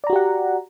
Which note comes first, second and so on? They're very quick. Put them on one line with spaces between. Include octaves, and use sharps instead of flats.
D5 A#5 F#4 G4 F#5